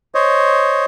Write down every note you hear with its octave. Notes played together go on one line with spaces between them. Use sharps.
C5 C#5 D#5